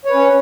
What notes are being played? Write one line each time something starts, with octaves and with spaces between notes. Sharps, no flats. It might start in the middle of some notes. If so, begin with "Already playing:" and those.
C#4 B4 C#5